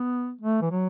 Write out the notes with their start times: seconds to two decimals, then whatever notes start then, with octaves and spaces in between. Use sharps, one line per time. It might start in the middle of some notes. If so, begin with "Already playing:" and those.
Already playing: B3
0.41 A3
0.62 E3
0.71 F#3